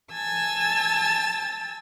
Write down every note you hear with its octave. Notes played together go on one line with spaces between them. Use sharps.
G#5 A5 E6 A6